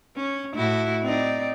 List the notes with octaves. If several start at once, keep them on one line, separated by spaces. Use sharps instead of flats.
C#4
A2 E4 F#4
C4 D#4 D5